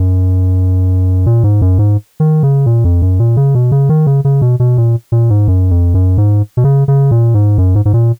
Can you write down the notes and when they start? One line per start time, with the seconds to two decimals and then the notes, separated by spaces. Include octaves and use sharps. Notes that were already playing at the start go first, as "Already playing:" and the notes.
Already playing: F#2
1.26 A#2
1.44 G#2
1.61 F#2
1.79 G#2
2.20 D#3
2.43 C#3
2.66 A#2
2.84 F2
3.02 F#2
3.19 A#2
3.37 C#3
3.55 B2
3.72 C#3
3.89 D#3
4.07 C#3
4.25 C#3
4.42 B2
4.60 B2
4.77 A#2
5.12 A#2
5.30 G#2
5.48 F#2
5.70 F2
5.94 F#2
6.18 G#2
6.57 B2
6.64 C#3
6.88 C#3
7.11 A#2
7.34 G#2
7.58 F#2
7.75 G#2
7.85 G#2
7.93 A#2